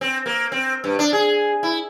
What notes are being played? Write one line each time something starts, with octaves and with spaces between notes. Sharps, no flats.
C4
A#3
C4
G2
D4
G#4
E4